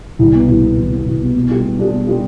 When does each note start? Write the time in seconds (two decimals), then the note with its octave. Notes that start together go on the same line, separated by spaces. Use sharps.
0.19 C2
0.34 B2 B3
0.48 C2
0.62 B2 B3
0.77 C2
0.92 B2 B3
1.06 C2
1.20 B2 B3
1.35 B2
1.49 G3 D4 F4 G#4
1.64 B2
1.79 G3 D4 F4 G#4
1.92 B2
2.07 G3 D4 F4 G#4